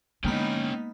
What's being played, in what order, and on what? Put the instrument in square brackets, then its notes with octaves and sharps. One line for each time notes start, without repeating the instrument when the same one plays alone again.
[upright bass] D3 [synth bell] G#3 A#3 B5 [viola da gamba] B3 D#4 [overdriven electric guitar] C#4 G5